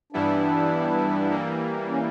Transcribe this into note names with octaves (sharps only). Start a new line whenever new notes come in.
G2 E3 G3 B3 D4 E4
E3 G3 A#3
C#4